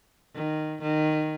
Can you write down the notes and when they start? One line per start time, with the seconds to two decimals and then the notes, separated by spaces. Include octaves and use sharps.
0.35 D#3
0.82 D#3